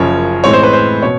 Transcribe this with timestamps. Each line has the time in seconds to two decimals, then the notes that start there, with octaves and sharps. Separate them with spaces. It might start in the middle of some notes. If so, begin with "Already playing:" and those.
Already playing: F#1 F#2 C#3 F3 C#5
0.44 A2 E3 G#3 C4 C#5
0.53 C5
0.63 B4
0.73 C5
1.02 B2 C#5